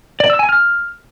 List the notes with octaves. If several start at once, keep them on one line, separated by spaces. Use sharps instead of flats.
D5
E6
G#5
F6